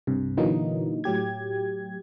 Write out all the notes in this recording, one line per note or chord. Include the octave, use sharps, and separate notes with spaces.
C2 G2 C3
A#2 D3 E3 F#3 A#3 D#4
A2 F#3 G4 G#6